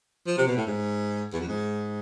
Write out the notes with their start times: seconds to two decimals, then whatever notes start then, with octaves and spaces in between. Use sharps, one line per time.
0.27 F3
0.37 C3
0.47 B2
0.57 A2
0.67 G#2
1.33 E2
1.40 F2
1.48 G#2